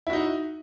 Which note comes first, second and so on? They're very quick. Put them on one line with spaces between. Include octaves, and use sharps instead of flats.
E4 F#4 D#4